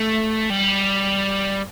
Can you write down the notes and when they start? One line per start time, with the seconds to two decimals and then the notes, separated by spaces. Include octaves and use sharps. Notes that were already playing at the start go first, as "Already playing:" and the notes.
Already playing: A3
0.50 G3